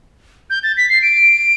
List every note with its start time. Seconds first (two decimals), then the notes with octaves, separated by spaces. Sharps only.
0.50 G6
0.63 A6
0.77 B6
0.89 C7
1.02 D7